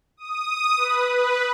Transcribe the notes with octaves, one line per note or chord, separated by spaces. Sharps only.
D#6
B4
B4